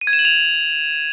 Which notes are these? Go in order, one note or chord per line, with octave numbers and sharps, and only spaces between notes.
D#7
G#6
E7
F#7
F7